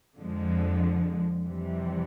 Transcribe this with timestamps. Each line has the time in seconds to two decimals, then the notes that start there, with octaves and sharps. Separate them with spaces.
0.18 F2 D3 F3 G#3
1.45 F2 C3 E3 G3